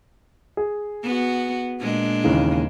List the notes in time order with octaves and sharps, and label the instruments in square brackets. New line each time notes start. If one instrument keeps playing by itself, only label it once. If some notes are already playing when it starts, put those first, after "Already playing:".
[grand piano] G#4
[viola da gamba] B3 F#4
A#2 G#3 D4
[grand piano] D#2 C#3 E3